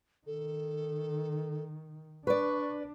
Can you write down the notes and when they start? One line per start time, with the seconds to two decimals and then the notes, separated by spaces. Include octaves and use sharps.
0.26 D#3 A4
2.27 D4 B4 D5 C#6